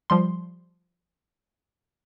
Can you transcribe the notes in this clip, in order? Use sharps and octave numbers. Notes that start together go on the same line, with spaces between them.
F3 G3 C6